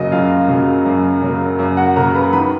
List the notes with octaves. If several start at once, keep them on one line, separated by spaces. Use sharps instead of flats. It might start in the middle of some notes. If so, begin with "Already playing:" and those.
Already playing: F#2 C#3 F#3 A#3 F#4 D#5
F#2 F4 F5
C#3 F#3 A#3
F#2
C#3 F#3 A#3
F#2
F#4 F#5
C#3 F#3 A#3 A#4 A#5
B4 B5
D#3 B4 B5